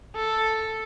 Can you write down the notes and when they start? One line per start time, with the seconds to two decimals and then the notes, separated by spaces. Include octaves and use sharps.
0.15 A4